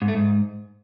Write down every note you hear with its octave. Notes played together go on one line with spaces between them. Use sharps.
G#2
A3
G#2